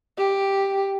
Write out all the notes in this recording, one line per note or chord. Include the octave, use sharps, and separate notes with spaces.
G4